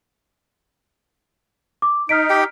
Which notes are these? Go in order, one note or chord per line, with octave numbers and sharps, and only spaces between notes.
D6
D#4 F6 B6 D7
G4 G5